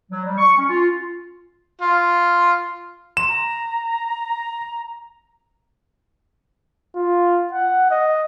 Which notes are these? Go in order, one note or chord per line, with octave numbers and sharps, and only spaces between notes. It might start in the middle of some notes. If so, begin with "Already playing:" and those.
F#3
G3
C#6
C#4
F4
F4
C6 E7
A#5
F4
F#5
D#5